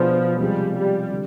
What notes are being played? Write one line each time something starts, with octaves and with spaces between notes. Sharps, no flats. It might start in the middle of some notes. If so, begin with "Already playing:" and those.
Already playing: B2 F3 B3 D4 G#4
C3 F3 G3 G#3
G3
D3 G3